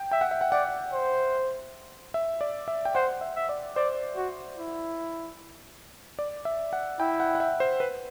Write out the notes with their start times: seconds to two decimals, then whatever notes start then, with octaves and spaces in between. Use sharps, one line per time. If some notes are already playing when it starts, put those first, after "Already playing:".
Already playing: G5
0.11 E5 G5
0.21 F#5
0.31 E5
0.41 F#5
0.51 D5 F#5
0.93 C5
2.14 E5
2.41 D5
2.68 E5
2.85 G5
2.95 C5 F#5
3.21 E5
3.36 E5
3.49 D5
3.76 C5 D5
4.16 F#4
4.57 E4
6.19 D5
6.45 E5
6.73 F#5
7.00 E4 G5
7.20 F#5
7.35 F#5
7.40 E5
7.60 C5
7.80 B4